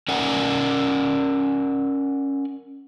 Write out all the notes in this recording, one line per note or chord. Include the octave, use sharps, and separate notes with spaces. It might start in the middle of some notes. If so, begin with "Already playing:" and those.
C#4 A#4 D5 F#5 G#5